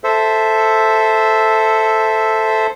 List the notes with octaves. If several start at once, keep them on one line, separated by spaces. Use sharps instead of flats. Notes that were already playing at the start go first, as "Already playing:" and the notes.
A4 C5 E5